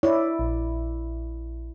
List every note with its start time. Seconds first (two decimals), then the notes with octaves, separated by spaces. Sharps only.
0.03 E4 C#5 D5
0.39 A#1